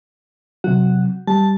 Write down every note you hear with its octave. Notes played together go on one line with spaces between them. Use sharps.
C3 F#3 F#4
G3 A5